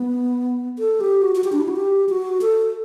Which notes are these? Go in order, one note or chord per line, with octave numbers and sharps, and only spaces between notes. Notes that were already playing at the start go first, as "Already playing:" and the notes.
Already playing: B3
A4
G4
F#4
F#4
G4
D4
E4
F#4
G4
F#4
A4